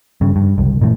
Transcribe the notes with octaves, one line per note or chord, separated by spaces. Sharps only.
G2 C#3
G2
F#1 C2
A#2 E3 G3 A3